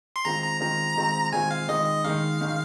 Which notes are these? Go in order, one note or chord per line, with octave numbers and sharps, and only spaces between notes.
C6
D#3 G#3 C4 F4 A#5
A#5
D#3 G#3 C4 F4 A#5
D#3 G#3 C4 F4
D#3 G#3 C4 F4 G#5
F5
D#3 G#3 D#4 D#5
D#5
D#3 G#3 D#4 F5
D#3 G#3 D#4